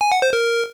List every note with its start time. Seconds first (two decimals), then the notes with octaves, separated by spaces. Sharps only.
0.01 G#5
0.12 F#5
0.22 C5
0.33 A#4